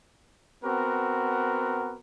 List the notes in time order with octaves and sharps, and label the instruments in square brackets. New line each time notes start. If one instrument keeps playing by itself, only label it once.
[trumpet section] B3 C4 F#4 A#4